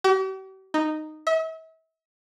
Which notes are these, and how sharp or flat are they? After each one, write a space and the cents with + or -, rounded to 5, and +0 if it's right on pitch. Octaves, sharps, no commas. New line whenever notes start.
G4 -45
D#4 -10
E5 -40